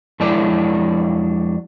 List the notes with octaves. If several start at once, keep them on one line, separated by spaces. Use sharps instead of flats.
F2 F#3 G#3 D4 E4 D5